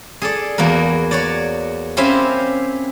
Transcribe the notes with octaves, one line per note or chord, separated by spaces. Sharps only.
G#4 A4 D5
E2 A#3 F#4 A#4
F#4 C#5 D5
C4 C#4 E4 G4 C5 F5